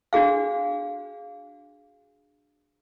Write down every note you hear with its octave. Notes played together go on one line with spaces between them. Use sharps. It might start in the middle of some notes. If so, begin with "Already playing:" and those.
D4 F#4 G#4 F5